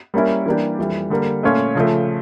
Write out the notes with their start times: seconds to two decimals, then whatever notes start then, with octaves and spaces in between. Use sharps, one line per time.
0.14 G3 A#3 C#4 E4 A#4
0.46 E3 G3 A#3 D4 G4
0.78 F2 E3 G3
1.10 D3 G3 A#3
1.43 A#2 A3 C#4 F4 C#5
1.75 C#3 F3 A3